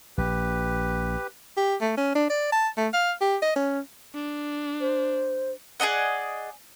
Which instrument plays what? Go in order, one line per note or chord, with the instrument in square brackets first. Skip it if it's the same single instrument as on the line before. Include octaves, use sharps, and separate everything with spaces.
[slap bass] A#1 [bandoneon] G4 B4
[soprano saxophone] G4
A3
C#4
D4
D5
A5
A3
F5
G4
D#5
C#4
[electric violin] D4
[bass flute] C5
[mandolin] G#4 D5 D#5 F#5